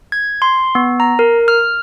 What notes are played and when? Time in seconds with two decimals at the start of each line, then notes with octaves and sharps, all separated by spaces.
0.12 G#6
0.42 C6
0.75 B3
1.00 A#5
1.19 A#4
1.48 F6